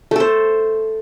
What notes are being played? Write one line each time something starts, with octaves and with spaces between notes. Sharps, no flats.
A3 A4 C5